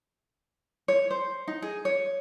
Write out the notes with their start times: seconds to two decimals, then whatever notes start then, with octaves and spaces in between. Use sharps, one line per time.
0.88 C#5
1.11 C5
1.48 D#4
1.62 G#4
1.85 C#5